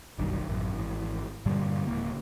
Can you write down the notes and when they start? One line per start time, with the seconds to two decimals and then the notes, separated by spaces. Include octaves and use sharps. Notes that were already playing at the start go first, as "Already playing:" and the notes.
0.18 F#1 B1 G2 D#3
0.49 A1 F#2
0.73 G#1 E3
1.46 G2 A#2 D3 G3
1.87 D1 C#3 A#3